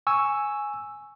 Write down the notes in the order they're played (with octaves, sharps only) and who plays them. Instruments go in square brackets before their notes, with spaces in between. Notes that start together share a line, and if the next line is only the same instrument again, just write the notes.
[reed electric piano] G#5 C#6 E6